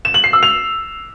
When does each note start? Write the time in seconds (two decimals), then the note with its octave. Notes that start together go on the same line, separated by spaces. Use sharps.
0.05 E7
0.14 F#7
0.24 C7
0.33 E6
0.43 F7